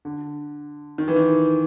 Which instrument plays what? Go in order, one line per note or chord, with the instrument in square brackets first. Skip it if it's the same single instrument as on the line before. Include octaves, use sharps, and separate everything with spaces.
[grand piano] D3
D#3
E3
D#3